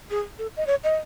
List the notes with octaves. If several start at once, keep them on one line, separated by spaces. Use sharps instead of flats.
G#4
A4
D#5
C#5
D#5